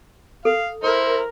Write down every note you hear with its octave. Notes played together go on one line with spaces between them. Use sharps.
A4 F5
E4 A#4 C5